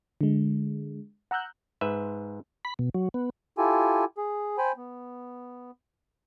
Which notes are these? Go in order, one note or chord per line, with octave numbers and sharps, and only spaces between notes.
D3 G#3
F#5 A#5 E6 F#6 G6
G#2 B4 E5
B5
B2
F#3
B3
E4 F4 G4 A4 G#5
G#4
C5 G5 G#5 B5
B3